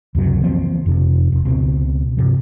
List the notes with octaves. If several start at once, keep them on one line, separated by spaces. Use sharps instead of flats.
C#2 F#2 C3 F#3
E3 F3 A#3 C4
F2 C3
E1
C#2 B2 C4
G2 C3 F3